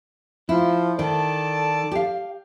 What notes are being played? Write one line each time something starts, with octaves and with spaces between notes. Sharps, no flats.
F3 E4
D#3 A4 D5 A5
G4 F5